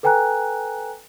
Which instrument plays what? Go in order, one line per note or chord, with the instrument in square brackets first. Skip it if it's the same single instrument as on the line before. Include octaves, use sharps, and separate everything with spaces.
[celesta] A4 B4 G5 G#5 A#5 F#6